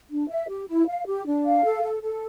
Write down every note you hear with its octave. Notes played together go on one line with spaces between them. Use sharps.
D4
E5
G4
E4
F5
G4
D4
F5
A4
A4
A4